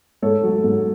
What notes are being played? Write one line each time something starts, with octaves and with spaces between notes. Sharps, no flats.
G#2 A4 C#5
F#3 A3
G#2